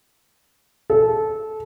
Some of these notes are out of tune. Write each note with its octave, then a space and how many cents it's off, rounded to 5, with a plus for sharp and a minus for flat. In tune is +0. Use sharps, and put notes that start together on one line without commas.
A4 -20